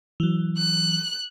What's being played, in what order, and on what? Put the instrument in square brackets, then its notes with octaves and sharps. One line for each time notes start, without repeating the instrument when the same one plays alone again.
[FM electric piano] E3 F#3
[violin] F#6